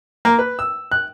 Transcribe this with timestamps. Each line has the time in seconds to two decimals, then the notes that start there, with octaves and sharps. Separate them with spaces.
0.25 A#3
0.39 B4
0.59 E6
0.92 F#6